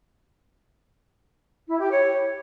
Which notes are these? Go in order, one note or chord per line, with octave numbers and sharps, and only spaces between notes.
E4
G4
C#5